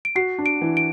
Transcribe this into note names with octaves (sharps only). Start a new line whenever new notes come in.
D7
F#4 C7
D4
D7
E3
D7